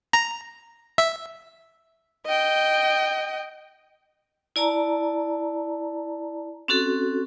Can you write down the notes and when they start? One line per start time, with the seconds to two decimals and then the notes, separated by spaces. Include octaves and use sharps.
0.13 A#5
0.98 E5
2.26 D#5 G5
4.56 E4 D5 A5 A#5
6.68 C4 C#4 F#4 A4